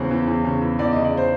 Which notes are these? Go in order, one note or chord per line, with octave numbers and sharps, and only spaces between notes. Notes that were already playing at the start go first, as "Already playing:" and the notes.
Already playing: E2 C#3 C5
E2
E2
C#3
E2
E2 D5
D#5
C#3
D5
C5